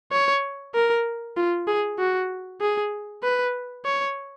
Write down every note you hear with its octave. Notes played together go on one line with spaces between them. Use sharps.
C#5
A#4
F4
G#4
F#4
G#4
B4
C#5